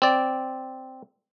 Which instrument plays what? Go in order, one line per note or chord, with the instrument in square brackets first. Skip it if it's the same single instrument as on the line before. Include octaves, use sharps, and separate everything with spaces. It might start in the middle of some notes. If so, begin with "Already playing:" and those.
[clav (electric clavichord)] C4 D5